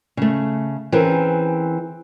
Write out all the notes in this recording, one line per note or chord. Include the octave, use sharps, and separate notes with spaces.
C#3 A3
E3 C4 C#4 G#4 A#4